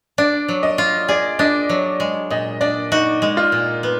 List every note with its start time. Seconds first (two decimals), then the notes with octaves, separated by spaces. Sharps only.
0.18 D4 D5
0.48 F#3
0.63 D#5
0.78 F4
1.08 G#4 D5
1.39 D4 D#5
1.69 F#3
2.00 G#3
2.30 A#2 D#5
2.61 D4 D5
2.92 D#4 F#4
3.22 G#3
3.37 F4
3.52 A#2
3.83 B3